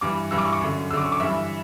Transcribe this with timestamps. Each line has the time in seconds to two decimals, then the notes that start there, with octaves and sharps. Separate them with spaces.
0.01 G2 E3 D6
0.31 G2 E3 E6
0.38 D6
0.45 C#6
0.53 D6
0.61 F#2 D3
0.90 F#2 E6
0.93 D3 D6
1.05 C#6
1.12 D6
1.20 G2 E3 E5